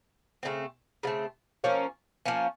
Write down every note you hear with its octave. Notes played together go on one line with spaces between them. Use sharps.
C#3 F3 A3 C4
C#3 F3 A3 C4
F3 A#3 C#4
F3 A#3 C#4